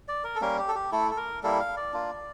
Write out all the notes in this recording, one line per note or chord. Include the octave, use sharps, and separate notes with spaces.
D5
A#4
A4
G3 A#3 C#4 A#4
G4
A4
G4
A3 E4 A4
A4
A#4
G3 A#3 E4 A4
F5
D5
A#3 D4 F4